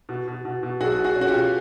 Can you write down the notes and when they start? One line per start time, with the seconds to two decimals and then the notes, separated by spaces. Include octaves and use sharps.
0.09 B2
0.27 B2
0.45 B2
0.63 B2
0.81 B1 F#4 G#4
0.98 B2
1.04 F#4 G#4
1.15 C#4
1.21 F#4
1.27 F4 G4
1.34 B2